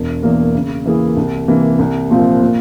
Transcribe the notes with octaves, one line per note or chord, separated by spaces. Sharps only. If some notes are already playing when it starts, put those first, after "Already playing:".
Already playing: E1
E2 E3 A#3
C#3
E3 A#3 E4 G#4
C2
C3 E3 A#3
C2
A#2 F3 C4 F4
A#2